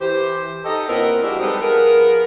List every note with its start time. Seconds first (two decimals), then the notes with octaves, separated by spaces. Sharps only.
0.01 E3 G4 C5
0.65 D#4 G4 A4 D#5
0.88 A#2 B3 C4 E4 A#4 D#5
1.22 F3 G#3 D4 E4 F#4 G4
1.39 G3 G#3 C4 D#4 A4 B4
1.62 F3 B3 G#4 A#4